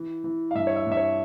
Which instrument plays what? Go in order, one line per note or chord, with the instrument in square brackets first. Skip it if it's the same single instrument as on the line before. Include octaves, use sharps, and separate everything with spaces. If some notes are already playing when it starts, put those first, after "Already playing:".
Already playing: [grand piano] E3
E3
F5
G2 E5
C#5
E5
G2 E5
C#5